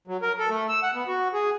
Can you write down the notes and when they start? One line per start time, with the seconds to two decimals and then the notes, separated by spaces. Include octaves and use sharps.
0.08 F#3
0.22 A#4
0.39 A4
0.50 A3
0.69 E6
0.83 F#5
0.94 B3
1.07 F#4
1.33 G#4